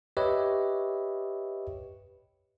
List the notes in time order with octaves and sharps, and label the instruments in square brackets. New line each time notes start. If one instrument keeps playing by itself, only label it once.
[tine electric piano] G4 B4 C#5 D#5 E5